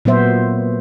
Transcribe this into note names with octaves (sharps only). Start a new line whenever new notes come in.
A#2 F#3 B3 C5 E5